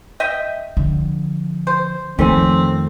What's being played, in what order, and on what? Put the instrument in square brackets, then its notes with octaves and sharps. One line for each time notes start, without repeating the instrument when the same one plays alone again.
[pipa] D#5 E5 G5
[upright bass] D3 F3
[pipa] C5
[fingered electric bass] F2 D#3 A3 [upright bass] F3 A#3 [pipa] G3 C#4 [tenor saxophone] C4